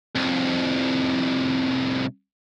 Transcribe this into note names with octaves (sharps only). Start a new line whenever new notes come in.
C2 F2